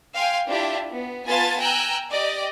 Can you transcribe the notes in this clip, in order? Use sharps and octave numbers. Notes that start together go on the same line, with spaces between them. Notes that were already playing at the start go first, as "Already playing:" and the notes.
F5 G5 G#5 C6
D4 E4 F4 G4
B3
B3 F4 B4 G#5 A5 A6
G5 G#5 A#5 E6 F#6
G4 D5 D#5